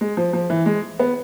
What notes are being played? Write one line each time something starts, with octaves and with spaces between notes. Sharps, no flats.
G#3
F3
F3
E3
G#3
B3